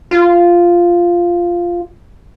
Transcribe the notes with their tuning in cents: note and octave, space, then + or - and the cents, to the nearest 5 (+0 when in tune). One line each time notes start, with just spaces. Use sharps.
F4 -5